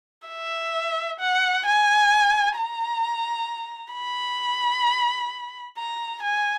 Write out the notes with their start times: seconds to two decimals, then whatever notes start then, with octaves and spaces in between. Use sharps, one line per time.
0.28 E5
1.20 F#5
1.66 G#5
2.57 A#5
3.94 B5
5.77 A#5
6.22 G#5